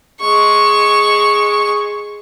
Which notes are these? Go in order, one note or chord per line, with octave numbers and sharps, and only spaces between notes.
G#3 C#6